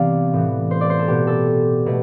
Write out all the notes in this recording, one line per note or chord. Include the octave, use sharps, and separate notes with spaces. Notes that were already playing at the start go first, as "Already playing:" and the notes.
Already playing: C2 C3 E3 B3 D5 F5
A2 E3 B3
C5
D5
C5
A4
B2 B3 G4
A4
B2 A3